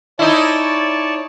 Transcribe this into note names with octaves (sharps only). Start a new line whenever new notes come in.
D#4 E4 C#5 D5 A5